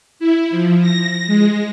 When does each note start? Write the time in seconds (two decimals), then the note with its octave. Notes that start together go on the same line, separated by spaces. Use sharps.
0.19 E4
0.50 F3
0.81 A#6
1.26 G#3